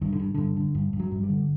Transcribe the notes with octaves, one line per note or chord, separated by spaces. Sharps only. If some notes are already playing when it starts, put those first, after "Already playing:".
G2 D#3
D3
G2
G2 D3
D3
G2
G2
F#3
G2
G3
D3